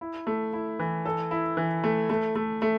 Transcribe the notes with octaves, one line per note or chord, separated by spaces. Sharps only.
E4
A3
E4
E3
A4
E4
E3
A3
A3
A3
A3